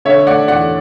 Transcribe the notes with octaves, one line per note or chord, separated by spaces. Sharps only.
D3 C#5 E5
A3 D5 F#5
E2 D5 F#5